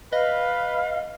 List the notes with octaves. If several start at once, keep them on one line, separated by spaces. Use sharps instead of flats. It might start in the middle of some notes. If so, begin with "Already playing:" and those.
B4 D#5 F5